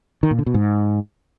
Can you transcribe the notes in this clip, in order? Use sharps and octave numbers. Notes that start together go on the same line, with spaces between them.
D#3
A#2
D3
B2
G#2